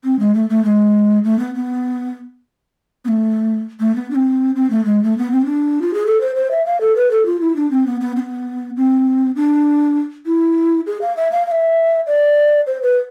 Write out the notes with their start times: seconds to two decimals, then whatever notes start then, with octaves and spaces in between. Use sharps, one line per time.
0.05 C4
0.20 G#3
0.35 A3
0.50 A3
0.65 G#3
1.24 A3
1.39 B3
1.55 B3
3.05 B3
3.08 A3
3.80 A3
3.96 B3
4.11 D4
4.15 C4
4.56 C4
4.70 A3
4.85 G#3
5.03 A3
5.18 B3
5.31 C4
5.45 D4
5.82 F4
5.94 G#4
6.06 A4
6.21 C5
6.36 C5
6.51 E5
6.66 F5
6.81 A4
6.96 B4
7.11 A4
7.26 F4
7.41 E4
7.56 D4
7.71 C4
7.87 B3
8.01 B3
8.16 C4
8.20 B3
8.77 C4
9.36 D4
10.26 E4
10.87 G#4
11.01 F5
11.17 E5
11.32 F5
11.47 F5
11.52 E5
12.07 D5
12.67 C5
12.82 B4